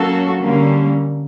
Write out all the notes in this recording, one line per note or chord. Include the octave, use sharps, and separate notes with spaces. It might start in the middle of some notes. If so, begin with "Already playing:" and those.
Already playing: F#3 A#3 C#4 F#4 A4
D3 G3 A#3 C#4